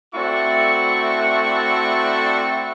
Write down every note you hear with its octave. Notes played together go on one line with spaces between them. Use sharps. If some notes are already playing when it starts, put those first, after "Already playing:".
A3 C4 E4 F#4 D5 C#6